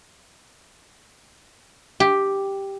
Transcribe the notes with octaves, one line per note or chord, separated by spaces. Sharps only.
G4